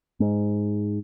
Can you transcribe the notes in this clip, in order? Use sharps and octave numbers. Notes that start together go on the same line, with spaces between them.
G#2